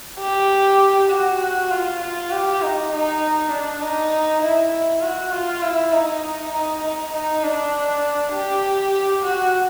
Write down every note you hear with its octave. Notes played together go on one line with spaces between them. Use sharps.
G4
F#4
F#4
F4
F4
G4
D#4
D#4
D4
D#4
E4
E4
F#4
F4
E4
D#4
D#4
D#4
D#4
D4
G4
F#4